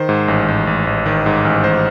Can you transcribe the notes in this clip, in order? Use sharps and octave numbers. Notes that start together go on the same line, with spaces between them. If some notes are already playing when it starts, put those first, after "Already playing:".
Already playing: D#3 C5
G#2
A1
A1
A1
A1
D#3
G#2
A1
A1 C5